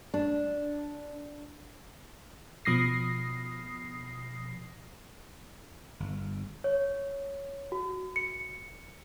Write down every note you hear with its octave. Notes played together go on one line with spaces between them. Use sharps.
D4
B2 F3 D#6 A#6 C7
G1
C#5
F#4
C#7